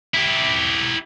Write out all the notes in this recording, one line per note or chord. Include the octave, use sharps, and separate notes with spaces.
E4 G4